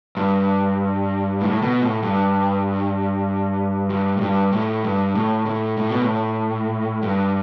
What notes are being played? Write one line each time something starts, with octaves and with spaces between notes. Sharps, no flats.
G2
A2
B2
A2
G2
G2
A2
G2
A2
G2
A2
A2
A2
B2
A2
G2